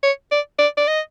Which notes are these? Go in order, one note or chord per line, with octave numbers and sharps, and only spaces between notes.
C#5
D5
D5
D5
D#5